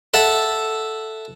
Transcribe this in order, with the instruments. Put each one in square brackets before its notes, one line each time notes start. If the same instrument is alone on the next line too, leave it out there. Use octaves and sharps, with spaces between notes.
[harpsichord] A4 E5 F#5 A5